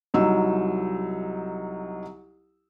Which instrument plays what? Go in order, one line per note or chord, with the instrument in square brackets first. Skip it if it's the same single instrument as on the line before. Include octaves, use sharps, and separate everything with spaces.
[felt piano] C2 F#3 D#4 E6